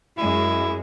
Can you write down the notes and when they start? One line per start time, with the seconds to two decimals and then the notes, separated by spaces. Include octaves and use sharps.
0.18 F#2 G#3 E4